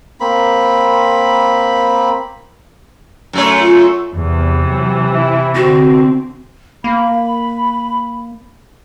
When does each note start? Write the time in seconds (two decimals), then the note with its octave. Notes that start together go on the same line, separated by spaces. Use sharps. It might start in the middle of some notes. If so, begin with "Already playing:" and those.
0.20 A#3 C4 B5
3.33 F#2 A3 C#5
3.61 F4
4.15 E2 C3 E3
4.69 F#3
5.12 E4
5.55 D3 C4 F#4
6.84 A#3 B5